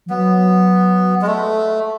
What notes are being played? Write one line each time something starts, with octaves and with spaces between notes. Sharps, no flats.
F3
F#3 B3
G#3
A3